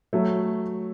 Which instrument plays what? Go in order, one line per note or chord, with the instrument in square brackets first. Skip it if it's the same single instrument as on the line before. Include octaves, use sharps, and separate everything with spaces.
[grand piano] F#3 A3